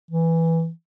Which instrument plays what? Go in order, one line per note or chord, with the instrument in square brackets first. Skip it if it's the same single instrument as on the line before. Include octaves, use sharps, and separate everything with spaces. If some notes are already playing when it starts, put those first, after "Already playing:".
[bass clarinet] E3